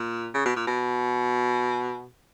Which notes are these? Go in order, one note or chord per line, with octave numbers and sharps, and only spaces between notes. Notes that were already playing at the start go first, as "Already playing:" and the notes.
Already playing: A#2
C#3
B2
A#2
B2